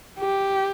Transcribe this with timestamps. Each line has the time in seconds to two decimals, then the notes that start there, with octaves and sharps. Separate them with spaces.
0.19 G4